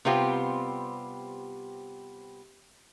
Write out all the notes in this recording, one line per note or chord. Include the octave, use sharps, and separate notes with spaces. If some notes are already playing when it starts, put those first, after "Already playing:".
C3 G3 B3 C4 F4 G4